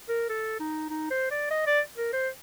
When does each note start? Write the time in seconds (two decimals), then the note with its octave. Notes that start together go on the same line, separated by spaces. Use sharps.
0.09 A#4
0.29 A4
0.60 D#4
0.90 D#4
1.11 C5
1.31 D5
1.51 D#5
1.67 D5
1.98 A#4
2.13 C5